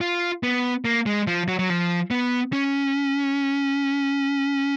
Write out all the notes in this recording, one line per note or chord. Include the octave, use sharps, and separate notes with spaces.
F4
B3
A#3
G#3
F3
F#3
F#3
F3
B3
C#4